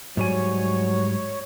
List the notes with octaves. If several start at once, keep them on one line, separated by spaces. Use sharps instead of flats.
G#2 F#3 G3 C#5 G#5